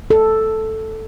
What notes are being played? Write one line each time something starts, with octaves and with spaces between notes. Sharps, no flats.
A4